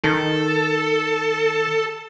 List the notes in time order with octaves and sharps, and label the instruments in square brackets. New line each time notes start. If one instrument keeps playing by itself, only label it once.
[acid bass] D#3 [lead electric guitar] A4